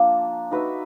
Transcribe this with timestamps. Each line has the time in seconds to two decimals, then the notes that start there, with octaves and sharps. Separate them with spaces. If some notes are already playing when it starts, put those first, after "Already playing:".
Already playing: F3 A#3 D4
0.51 D#4 F#4 B4 E5